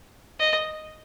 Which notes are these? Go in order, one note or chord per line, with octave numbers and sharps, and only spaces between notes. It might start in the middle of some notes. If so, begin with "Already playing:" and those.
D#5